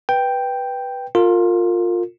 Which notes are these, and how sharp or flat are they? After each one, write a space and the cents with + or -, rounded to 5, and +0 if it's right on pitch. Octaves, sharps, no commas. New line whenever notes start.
B4 -10 G5 +0
F4 +15 A#4 -35